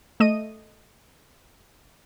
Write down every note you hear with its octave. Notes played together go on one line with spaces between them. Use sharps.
A3 D#5 D#7